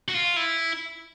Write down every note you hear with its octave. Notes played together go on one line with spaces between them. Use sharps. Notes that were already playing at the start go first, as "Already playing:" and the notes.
F#4
F4
E4